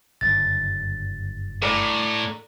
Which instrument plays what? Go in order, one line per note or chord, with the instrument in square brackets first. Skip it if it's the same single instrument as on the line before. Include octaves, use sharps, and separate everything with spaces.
[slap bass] F#1 G2 D3 [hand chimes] A6
[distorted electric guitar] A2 [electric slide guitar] A4 D5 A#5